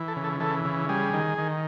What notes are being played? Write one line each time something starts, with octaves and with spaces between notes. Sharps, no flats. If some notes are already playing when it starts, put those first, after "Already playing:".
Already playing: E3
A4
C#3
A4
E3 A4
C#3
G3 G#4
D#3
D#3